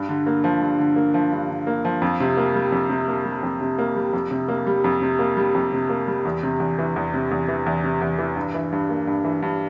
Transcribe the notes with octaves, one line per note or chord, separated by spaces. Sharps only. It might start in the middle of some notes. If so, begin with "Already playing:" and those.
Already playing: G2
D3
A#3
F3
G2
D3
A#3
F3
G2
D3
A#3
F3
F2
C3
A#3
G3
F2
C3
A#3
G3
F2
C3
A#3
G3
F2
C3
A#3
G3
F2
C3
A#3
G3
F2
C3
A#3
G3
E2
C3
E2
E3
E2
C3
E2
E3
E2
C3
E2
E3
G2
E3
G2
A#3
G2
E3
G2